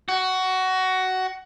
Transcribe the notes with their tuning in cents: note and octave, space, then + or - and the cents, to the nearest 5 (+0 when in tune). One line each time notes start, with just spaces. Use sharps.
F#4 +15